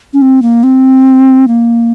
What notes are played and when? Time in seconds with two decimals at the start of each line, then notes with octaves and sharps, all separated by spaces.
0.13 C#4
0.22 C4
0.42 A#3
0.63 C4
1.48 A#3